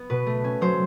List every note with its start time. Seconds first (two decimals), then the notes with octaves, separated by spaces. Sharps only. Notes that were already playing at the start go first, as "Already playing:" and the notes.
Already playing: B3
0.10 B2 B4
0.27 A3
0.44 C#4
0.61 F#3 C5